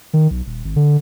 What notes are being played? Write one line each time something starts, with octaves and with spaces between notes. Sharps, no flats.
D#3
B1
D#1
G#1
D3